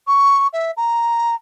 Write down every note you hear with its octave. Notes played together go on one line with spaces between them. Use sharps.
C#6
E5
A#5